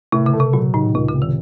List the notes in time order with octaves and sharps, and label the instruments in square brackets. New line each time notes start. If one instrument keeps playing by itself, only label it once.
[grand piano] A2 [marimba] C3
[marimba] C#3
[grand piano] A3
[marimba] C3
[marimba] A#2 [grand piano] F#3
[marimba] A2 [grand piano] D#3
[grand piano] C#2 [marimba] C3
[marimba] C#3
[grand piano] C3
[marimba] D#3